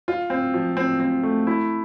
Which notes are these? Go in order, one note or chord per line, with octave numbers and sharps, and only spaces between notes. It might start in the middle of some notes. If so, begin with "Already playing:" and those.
F4
C4
F3
C4
C4
A3
E4